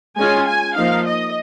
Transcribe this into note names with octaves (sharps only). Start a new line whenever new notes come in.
G#3 C#4 F4 G#5
G#5
F3 A#3 D#4 F5
D#5